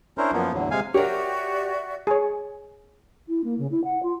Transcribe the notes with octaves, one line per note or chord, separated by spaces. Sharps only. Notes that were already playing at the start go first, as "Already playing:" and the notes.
C#4 D4 E4 A#4 C5
F#2 F3 A#3 B3
E2 A2 D3 F#3
C3 G#3 F5 G#5
F#4 G4 A#4 C#5 D5 E5
G#4 C#5
E4
A#3
C#3
E4
F#5
F4